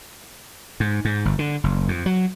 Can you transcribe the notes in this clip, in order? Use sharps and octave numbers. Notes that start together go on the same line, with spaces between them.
G#2
G#2
G1
D3
F#1
F2
F#3